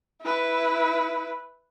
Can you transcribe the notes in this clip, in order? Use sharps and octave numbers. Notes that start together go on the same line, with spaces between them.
E4 B4